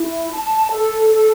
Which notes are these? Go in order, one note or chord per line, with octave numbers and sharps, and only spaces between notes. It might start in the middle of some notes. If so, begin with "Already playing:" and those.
Already playing: E4
A5
A4
A4